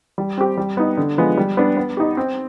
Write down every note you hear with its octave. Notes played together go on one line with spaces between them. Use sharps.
G3
C4 G4
G3
B3 D#4
D3
F3 G#3 B3
G3
B3 D4
B3
D#4 G4
C4